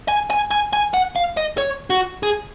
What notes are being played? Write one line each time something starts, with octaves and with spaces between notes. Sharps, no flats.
G#5
G#5
G#5
G#5
F#5
F5
D#5
C#5
F#4
G#4